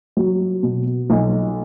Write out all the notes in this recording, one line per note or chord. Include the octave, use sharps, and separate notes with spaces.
F#3
B2
B1